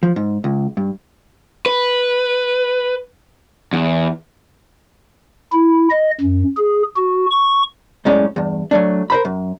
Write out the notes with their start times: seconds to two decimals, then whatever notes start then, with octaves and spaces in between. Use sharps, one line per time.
0.03 F3
0.16 G#2
0.44 C#2
0.77 G2
1.66 B4
3.73 E2
5.52 E4
5.91 D#5
6.20 F#2
6.57 G#4
6.96 F#4
7.31 C#6
8.05 B1 F#2 A2 G#3 C#4 D5
8.36 E2 G2
8.71 F#3 A3 D4
9.10 A#4 C5 B5
9.25 F#2